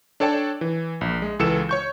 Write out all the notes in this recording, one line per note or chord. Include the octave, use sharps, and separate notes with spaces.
D4 A4 C#5 D5 G5 A5
E3
A#1
G#3
C#2 E3 A4 E6 C#7 E7
C#5 C#6 G6